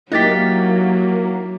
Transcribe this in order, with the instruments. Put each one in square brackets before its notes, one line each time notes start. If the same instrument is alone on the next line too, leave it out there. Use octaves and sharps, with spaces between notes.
[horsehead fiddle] F#3 [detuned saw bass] A#3 [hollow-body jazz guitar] D#4 G4 [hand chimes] E4 A6 B6